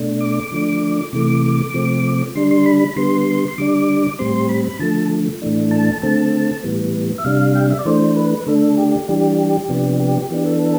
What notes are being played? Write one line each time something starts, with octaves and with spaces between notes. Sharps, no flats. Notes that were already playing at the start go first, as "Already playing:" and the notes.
Already playing: B2 A3 D4
D6
D3 F3 A3 D4
C3 E3 A3 D6
C3 F3 A3 C4
D3 G3 D4 C6
C6
B5
D3 G3 B3 C6
C6
D3 G3 D4 D6
A2 G3 C4 C6
B5
B5
D3 F3 A3 A5
A2 E3 A3 D4
A5
D3 A3 C4 A5
A2 E3 G3 B3
E5
C3 G3 D4 F5
G5
F5
E5
D5
E3 A3 D4 C5
B4
D3 A3 D4 A4
G4
E3 G3 D4 G4
G4
C3 F3 B3 D4
G4
E3 B3 D4 G4
A4